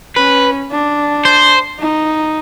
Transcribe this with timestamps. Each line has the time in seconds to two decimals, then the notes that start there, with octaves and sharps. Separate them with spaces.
0.17 C#4 B4
0.71 D4
1.25 C5
1.80 D#4